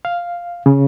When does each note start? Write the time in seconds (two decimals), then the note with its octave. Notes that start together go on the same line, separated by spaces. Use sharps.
0.05 F5
0.66 C#3